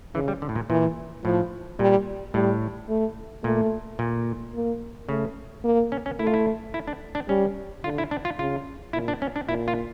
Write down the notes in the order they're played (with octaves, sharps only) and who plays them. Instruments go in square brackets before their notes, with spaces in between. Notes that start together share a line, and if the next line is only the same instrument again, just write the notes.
[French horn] C#3 [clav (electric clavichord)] E3
[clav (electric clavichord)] G3
D3
A2
A#2
[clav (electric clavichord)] A#2 [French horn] E3
[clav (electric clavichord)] A2 [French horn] F3
[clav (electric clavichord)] A#2 [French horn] G3
[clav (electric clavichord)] A2 [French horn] G3
[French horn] A3
[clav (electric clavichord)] A#2 [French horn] A3
[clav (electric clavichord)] A#2
[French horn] A#3
[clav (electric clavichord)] C#3 [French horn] A3
[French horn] A#3
[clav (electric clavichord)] C#4
C#4
[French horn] A3 [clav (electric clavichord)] E4
[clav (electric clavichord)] F4
E4
E4
D4
D4
[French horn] G3 [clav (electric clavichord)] C#4
[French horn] D3 [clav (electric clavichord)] F4
[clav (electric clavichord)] E4
D4
F4
[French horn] C#3 [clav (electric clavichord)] F4
[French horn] A#2 [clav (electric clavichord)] E4
[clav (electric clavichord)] D4
C#4
D4
[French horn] A#2 [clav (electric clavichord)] E4
[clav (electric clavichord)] F4